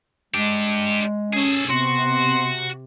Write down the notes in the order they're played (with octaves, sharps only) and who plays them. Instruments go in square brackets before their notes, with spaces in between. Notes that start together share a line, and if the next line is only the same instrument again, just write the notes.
[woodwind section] G#3 [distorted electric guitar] D4 G4
[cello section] C#4 [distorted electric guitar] G#4 A4
[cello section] C3 [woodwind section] B3 C6 [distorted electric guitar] F#4